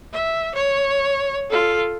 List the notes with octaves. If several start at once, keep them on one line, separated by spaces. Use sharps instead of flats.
E5
C#5
F4 A4